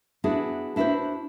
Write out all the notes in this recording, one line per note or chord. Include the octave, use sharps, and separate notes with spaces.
B3 D4 E4 F#4 G#4
D4 E4 F#4 A4 B4 C5